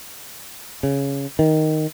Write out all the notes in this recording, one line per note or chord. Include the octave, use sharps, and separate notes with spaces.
C#3
D#3